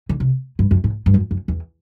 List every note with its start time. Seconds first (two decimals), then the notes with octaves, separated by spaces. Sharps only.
0.09 D3
0.20 C3
0.59 G2
0.71 F#2
0.84 A2
1.06 G2
1.14 F#2
1.31 F#2
1.48 E2